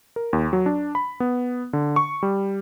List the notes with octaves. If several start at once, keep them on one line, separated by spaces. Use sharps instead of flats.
A#4
D#2
F#3
D4
B5
B3
D3
C#6
G3